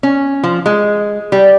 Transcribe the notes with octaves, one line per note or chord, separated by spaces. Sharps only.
C#4
F3
G#3
G3